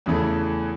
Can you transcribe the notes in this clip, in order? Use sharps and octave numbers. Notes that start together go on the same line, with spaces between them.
E2 C#3 E3 A3